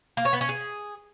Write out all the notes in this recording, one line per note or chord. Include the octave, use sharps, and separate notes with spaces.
A#3
C#5
B3
C#4
G#4